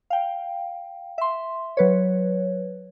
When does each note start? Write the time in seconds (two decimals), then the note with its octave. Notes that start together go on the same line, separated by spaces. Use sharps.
0.10 F5 G5
1.18 E5 C6
1.77 F#3 B4 C#5